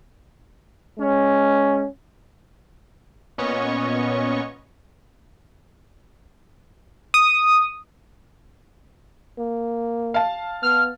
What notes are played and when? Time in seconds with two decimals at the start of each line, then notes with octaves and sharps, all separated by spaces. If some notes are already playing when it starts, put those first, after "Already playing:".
0.98 G#3 C#4
3.38 A#2 B3 C#4 C#5 D#5 C#6
7.14 D#6
9.38 A#3
10.14 F5 A5
10.63 B3 F6